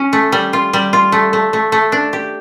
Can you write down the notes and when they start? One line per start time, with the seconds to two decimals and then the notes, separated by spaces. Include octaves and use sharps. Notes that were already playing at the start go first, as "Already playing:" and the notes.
Already playing: C#4
0.13 A3
0.32 G3
0.53 F4
0.73 G3
0.93 F4
1.12 A3
1.33 A3
1.53 A3
1.72 A3
1.92 D4
2.13 G4